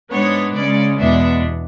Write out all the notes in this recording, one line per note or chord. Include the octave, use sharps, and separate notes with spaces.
G#2 G#3 B3 D4 C#5
C#3 G#3 C#4 D5
E2 B2 G#3 B3 D4 E5